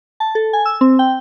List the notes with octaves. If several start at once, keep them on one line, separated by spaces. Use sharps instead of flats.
A5
A4
G#5
E6
C4
G5